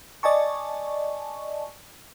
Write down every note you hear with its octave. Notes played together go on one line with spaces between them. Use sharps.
D5 D#5 G#5 A5 C#6